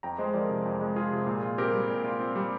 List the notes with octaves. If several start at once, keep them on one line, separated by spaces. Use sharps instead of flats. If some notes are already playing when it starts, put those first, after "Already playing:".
F2 G5 A#5
G#3 C5 D#5
F3 A#4 D5
C3
F2
G#3
F3 F4 G#4
C3
A#2
F4
C4 G4 A#4
G3
A#2
F4
C4
G3